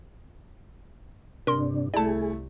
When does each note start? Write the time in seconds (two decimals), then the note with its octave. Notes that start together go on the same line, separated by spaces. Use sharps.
1.47 G2 C3 D4 A#4 C6
1.94 C2 A3 E4 G#4 D5 A5